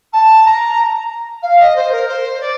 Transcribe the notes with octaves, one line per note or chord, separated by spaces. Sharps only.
A5
A#5
F5
D#5
C5
A#4
C5
D5